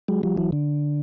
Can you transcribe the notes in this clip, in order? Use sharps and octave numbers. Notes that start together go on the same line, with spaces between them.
F#3 G#3
F3 G3
E3 F#3
D3